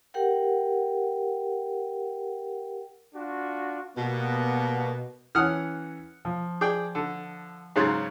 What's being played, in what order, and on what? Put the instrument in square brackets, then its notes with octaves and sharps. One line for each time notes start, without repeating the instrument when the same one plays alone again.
[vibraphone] G4 A#4 F#5 G5
[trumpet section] D4 F4 F#4
[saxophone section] B2 [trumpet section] G3 A#3 B3
[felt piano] E3 C#4 [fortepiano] F#5 D#6 F6
[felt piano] F3
[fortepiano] G#4 D5 G5
D3
[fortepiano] G#2 C#3 F#3 [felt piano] C#5 C6 A6